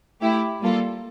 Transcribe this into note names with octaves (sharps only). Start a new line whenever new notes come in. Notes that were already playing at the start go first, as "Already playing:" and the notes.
A3 E4 G4
G3 A#3 F4 A4